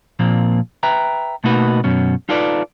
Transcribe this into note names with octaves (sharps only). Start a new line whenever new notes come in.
A#2 F3 A#3 C4
B4 E5 G5 A#5
B2 A3 A#3 D#4 F#4 B4
F#2 B2 C#4
D#4 F4 A4 B4 D5